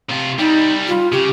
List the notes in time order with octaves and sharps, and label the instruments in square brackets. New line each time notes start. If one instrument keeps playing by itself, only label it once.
[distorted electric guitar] C3 F4
[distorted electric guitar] G3 E4 [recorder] D#4
[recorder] F4
[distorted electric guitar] C#3 [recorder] G4